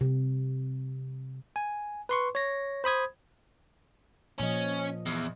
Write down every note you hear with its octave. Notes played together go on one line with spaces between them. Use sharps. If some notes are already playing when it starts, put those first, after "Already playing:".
C3
G#5
B4 C6 C#6
C#5 A#6
C5 B5 D#6 G#6
A#2 F3 C#4 D#5
E2